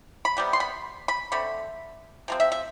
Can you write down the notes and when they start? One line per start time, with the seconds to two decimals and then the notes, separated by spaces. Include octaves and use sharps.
0.25 B5
0.37 C3 G3 B3
0.53 C6
0.60 B5
1.08 B5
1.32 D3 A3 C4 B5
2.28 C3 F3 C4
2.40 E5
2.52 E5